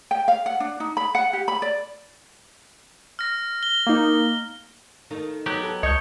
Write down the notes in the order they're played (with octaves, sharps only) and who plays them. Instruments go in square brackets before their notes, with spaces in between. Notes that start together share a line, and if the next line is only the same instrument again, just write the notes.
[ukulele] G5
F5
F#5
D4
D#4
B5
F#5
G4
B5
D5
[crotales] F6 A#6
G7
[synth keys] A#3 D#4
[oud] D#3 A3 D#4
[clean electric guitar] F#3 B3 G4
[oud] A4 B4
[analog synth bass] C#2 [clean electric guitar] C#5 [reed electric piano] D#5 G6